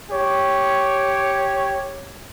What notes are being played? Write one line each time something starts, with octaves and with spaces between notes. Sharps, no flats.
G4 C#5